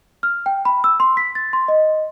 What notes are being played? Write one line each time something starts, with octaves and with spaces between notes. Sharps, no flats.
F6
G5
B5
E6
C6
B6
A6
C6
D#5